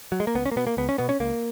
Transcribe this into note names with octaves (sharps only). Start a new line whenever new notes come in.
F#3
G#3
A#3
C#2 B3
C#4
A#3
B2 B3
A#3
C#2 B3
C#4
B2 B3
C#4
C#2 A#3